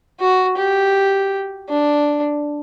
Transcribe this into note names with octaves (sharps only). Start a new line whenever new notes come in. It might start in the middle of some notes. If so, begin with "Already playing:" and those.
F#4
G4
D4